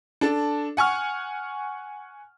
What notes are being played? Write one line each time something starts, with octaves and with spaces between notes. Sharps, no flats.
D4 A4
F#5 G#5 C#6 F6